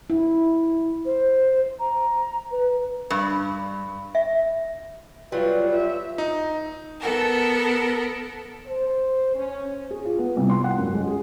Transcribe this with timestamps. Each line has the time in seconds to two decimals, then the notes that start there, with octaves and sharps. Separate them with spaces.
0.10 E4
1.05 C5
1.79 A#5
2.51 B4
3.10 G2
4.15 E5
5.32 F#3 G3 F4 B4
5.73 F4 E5
6.18 D#4
6.98 B3 A4 A#4
8.67 C5
9.35 C#4
9.90 G#4
10.05 F4
10.18 B3
10.37 C2
10.50 C6
10.64 F#5
10.78 F#2
10.94 G#3
11.07 G#4